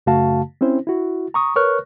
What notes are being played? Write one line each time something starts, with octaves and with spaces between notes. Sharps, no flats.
F#2 C#3 A3 F#4 F5 A5
C4 C#4 E4 C5
E4 F#4
A#5 C#6 D#6
A#4 B4 C#5 C#6 F6 F#6